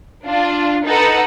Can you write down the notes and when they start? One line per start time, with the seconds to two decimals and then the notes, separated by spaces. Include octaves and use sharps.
0.25 D4 F4
0.85 D#4 A4 B4 F#5